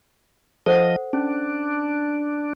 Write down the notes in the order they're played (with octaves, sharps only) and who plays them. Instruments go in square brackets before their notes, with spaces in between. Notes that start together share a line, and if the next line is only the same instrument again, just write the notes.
[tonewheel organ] F3 D#5 [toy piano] A4 C5 F#5
[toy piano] C#4 [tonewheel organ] D4